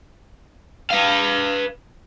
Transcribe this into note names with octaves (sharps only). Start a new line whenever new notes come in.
B4 F5